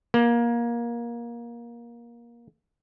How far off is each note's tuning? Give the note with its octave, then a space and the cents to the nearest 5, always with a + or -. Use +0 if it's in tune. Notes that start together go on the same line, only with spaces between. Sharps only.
A#3 +20